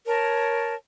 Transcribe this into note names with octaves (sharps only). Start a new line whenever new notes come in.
A#4 C#5 A5